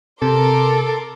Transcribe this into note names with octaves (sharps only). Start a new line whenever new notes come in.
C3 A4 A#4 C6 D6